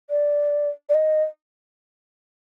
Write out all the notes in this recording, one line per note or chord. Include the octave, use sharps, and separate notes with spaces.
D5
D5
D#5